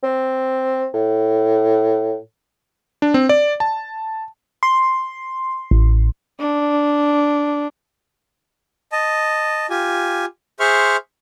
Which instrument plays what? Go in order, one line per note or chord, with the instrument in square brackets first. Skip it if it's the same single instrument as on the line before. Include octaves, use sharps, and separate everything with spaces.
[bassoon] C4
A2
[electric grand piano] D4
C4
D5
A5
[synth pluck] C6
A1
[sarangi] D4
[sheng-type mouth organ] D#5 A5
F4 G4 G#5
G#4 C5 E5 C6 C#6 F6